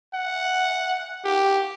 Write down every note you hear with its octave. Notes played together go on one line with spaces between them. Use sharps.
F#5
G4